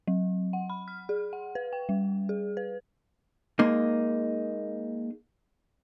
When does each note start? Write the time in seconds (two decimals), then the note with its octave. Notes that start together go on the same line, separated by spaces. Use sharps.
0.07 F#3
0.53 F#5
0.70 B5
0.88 F6
1.09 G#4
1.33 F#5
1.55 B4
1.73 G5
1.89 G3
2.29 G#4
2.57 B4
3.59 G#3 A#3 D#4